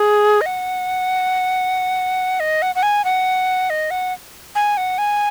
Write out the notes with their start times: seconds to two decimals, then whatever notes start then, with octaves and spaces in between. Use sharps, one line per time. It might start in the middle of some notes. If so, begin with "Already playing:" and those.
Already playing: G#4
0.41 D#5
0.46 F#5
2.40 D#5
2.62 F#5
2.75 F#5
2.83 G#5
3.05 F#5
3.70 D#5
3.91 F#5
4.55 G#5
4.77 F#5
4.98 G#5